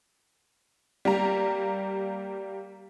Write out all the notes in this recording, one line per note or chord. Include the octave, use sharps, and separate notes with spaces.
G3 A#3 A#5